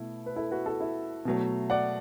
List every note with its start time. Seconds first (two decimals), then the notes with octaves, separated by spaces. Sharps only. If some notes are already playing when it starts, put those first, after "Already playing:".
Already playing: B2 A3 E4
0.26 B4
0.36 E4 A4
0.51 F#4 B4
0.66 E4 A4
0.80 E4
1.25 B2 F#3 A3
1.70 D5 F#5